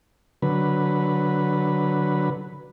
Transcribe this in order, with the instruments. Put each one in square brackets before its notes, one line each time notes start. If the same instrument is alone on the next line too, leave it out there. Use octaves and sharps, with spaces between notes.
[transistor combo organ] D3 F#3 B4